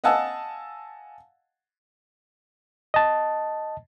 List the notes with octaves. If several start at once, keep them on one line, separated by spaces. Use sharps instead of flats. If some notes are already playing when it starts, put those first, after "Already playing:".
D#5 F5 F#5 G#5 A5 E6
D#5 A5